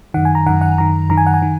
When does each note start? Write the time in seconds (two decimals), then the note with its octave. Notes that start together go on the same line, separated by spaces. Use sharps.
0.14 F#2 D#3 F#5
0.25 G#5
0.35 A#5
0.46 F#2 D#3 F#5
0.61 F#5
0.78 F#2 D#3 A#5
1.09 F#2 D#3 A#5
1.17 G#5
1.26 F#5
1.34 G#5
1.42 D#3